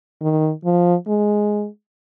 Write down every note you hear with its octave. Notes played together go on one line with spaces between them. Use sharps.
D#3
F3
G#3